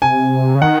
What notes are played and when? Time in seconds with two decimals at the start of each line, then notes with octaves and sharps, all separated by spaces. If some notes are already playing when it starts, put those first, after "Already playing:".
0.02 C3 G#5
0.55 C#3
0.61 D#3 F#5